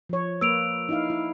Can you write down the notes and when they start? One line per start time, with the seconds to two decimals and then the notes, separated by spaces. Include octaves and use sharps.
0.09 F3 C#5
0.41 A#3 B4 E6 D7 F7
0.89 D#4 E4 F5
1.10 E4